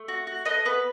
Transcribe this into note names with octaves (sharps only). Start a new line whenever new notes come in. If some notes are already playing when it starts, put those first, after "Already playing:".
Already playing: A3
F#4
F#4
A4 B4 D#5
B3 B4